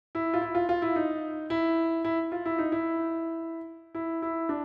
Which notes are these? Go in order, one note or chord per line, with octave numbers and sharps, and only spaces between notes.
E4
F4
E4
F4
F4
E4
D#4
E4
E4
F4
E4
D#4
E4
E4
E4
D4